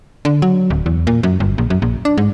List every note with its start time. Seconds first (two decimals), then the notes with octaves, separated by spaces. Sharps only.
0.25 D3
0.42 F#3
0.70 D1
0.86 E2
1.07 A#2
1.23 F#2
1.40 G1
1.58 A#1
1.70 F#2
1.82 A#1
2.05 D4
2.18 G#2